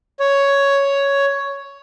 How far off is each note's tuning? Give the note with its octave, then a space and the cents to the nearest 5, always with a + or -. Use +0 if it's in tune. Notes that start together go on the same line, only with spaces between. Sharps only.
C#5 +5